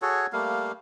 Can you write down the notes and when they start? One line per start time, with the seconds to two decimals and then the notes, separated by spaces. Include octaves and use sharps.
0.02 F#4 G#4 A4 C#5
0.33 G3 A3 A#3 F5